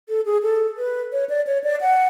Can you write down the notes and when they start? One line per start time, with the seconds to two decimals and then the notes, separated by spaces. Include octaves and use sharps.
0.09 A4
0.26 G#4
0.43 A4
0.78 B4
1.13 C#5
1.29 D5
1.47 C#5
1.64 D5
1.81 F#5